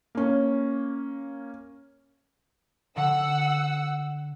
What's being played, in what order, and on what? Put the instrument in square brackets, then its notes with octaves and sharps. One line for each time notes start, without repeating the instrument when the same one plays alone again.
[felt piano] A#3 C#4
[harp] D3 [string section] F#5 E6